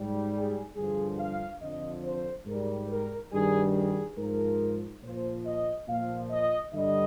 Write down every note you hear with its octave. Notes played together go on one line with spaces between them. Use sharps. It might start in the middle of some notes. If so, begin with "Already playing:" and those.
Already playing: G#2 G3
G#4
G2 D3 F3 G#4
F5
F2 D3 F3 D#5
C5
G#2 G3 A#4
A#4
G2 D#3 G3 G#4
G#4
G#2 F3 A#4
A#2 F3 C5
D#5
A#2 F3 F5
D#5
G2 D3 G3 D#5